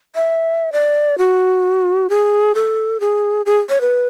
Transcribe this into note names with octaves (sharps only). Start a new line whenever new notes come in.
E5
D5
F#4
G#4
A4
G#4
G#4
C#5
B4